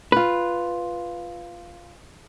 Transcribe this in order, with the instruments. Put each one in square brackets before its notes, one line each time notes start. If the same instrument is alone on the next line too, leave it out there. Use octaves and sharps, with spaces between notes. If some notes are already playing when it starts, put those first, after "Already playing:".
[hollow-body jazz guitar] F4 B4